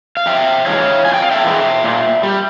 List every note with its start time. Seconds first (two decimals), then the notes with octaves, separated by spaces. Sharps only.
0.17 F5
0.26 F2 E5 G5
0.66 E3 G#3 C#5 F5
1.05 F2 G#5
1.14 G5
1.22 F5
1.31 E5 G5
1.45 E3 G#3
1.84 A#2
2.23 G3